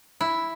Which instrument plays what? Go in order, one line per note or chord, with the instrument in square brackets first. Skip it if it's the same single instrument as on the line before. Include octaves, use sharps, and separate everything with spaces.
[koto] E4